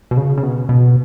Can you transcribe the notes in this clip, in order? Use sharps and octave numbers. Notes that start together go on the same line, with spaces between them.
B2
C#3
C#3
B2
B2